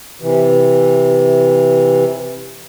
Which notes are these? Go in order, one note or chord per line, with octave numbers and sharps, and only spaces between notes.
C3 E3